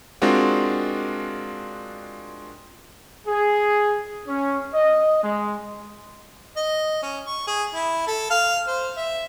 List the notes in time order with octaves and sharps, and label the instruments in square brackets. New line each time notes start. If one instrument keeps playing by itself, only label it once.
[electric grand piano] G#3 C4 D4 F4 F#4 A#4
[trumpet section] G#4
C#4
D#5
G#3
[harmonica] D#5
C#4
C#6
G#4
E4
A4
F5
C5
E5